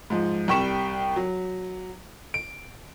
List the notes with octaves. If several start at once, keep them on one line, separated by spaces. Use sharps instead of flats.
G#2 F3
C2 G3 G5 C#6 B6 E7
F#3
D7